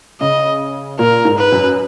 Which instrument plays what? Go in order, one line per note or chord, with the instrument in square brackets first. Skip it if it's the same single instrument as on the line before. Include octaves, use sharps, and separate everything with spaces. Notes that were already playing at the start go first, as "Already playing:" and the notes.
[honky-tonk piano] C#3 [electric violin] D#5
[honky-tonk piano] A#2 [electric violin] A#4
[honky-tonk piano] G#2
[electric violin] B4
[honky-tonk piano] F#2